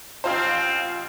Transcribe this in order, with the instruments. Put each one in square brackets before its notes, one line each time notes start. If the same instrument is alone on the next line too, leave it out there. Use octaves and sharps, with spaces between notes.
[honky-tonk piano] A1 F4 C5 [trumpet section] C4